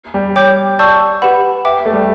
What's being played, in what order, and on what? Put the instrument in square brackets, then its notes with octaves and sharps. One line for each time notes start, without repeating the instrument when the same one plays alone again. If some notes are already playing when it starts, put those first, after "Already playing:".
[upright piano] G3
[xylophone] C#5 G5 D6 G6
D5 A5 C#6 E6 G6
G4 B4 F#5 B5
B4 E5 G5 D6
[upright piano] A3
G3